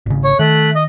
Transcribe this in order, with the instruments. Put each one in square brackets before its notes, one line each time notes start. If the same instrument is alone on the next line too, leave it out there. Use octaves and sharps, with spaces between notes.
[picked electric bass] G#1 C#3
[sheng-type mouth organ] C#5
[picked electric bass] D#3 [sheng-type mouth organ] A3 F#6
[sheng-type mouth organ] D#5